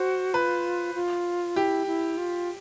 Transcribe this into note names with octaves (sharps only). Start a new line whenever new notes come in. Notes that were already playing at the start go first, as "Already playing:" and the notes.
Already playing: F#4 C5
F4 B4
F4
E4 G4
E4
F4